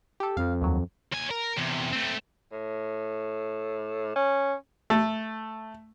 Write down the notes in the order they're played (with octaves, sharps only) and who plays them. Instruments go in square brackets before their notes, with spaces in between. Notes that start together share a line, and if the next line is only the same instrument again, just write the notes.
[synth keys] G4 A4
[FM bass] F2 [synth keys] F5
[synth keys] D#2 F#3
[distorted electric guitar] D#2 G#5
A#4
E2 C3
A3 C4
[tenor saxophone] A2
C#4
[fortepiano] A3